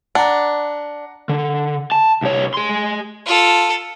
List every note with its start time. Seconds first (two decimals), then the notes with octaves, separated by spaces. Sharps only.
0.15 D4 F#5 A#5
1.29 D3
1.92 A5
2.22 C2 C#5
2.54 G#4 C6
3.26 F4 A4